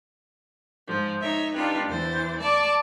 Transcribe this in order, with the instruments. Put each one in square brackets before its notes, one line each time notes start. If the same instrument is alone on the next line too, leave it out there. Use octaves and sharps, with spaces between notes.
[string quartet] G#2 F3
D#4 C#5 E5
D4 D#4 F4 G4 B4
E2 E3 C5 A6
D5 A5 C#6 D6